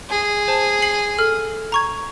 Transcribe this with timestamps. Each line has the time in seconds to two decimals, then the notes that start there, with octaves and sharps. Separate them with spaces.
0.10 G#4
0.48 C5 A5
0.82 C7 F#7
1.18 A4 F6
1.72 A#5 C#6 G#6